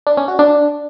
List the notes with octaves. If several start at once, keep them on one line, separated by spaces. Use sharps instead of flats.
D4
C#4
F#4
D4